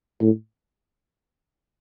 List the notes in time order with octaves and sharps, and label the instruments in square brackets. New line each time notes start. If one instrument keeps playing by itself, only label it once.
[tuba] A2